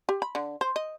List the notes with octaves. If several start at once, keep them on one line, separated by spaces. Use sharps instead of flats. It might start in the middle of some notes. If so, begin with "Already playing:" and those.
G4
B5
D3
C5
D#5